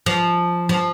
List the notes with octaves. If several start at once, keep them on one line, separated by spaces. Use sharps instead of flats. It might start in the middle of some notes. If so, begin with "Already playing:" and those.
F3
F3